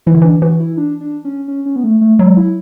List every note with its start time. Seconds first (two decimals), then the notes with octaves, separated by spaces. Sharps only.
0.06 E3 E4
0.14 D3
0.22 E3 D4
0.42 E3 F#4
0.60 E4
0.77 D4
1.01 D4
1.25 C#4
1.48 C#4
1.66 C#4
1.76 B3
1.84 A3
2.01 A3
2.19 F#3 G#3
2.37 E4